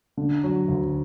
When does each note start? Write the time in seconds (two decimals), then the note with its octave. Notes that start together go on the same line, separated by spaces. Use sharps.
0.17 D3
0.43 F#3
0.68 D2